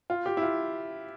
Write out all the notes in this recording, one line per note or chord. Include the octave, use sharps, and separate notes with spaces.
F4
G4
E4
F4